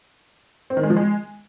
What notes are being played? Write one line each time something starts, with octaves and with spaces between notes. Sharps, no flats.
C4
D#3
G#3
F3
G#3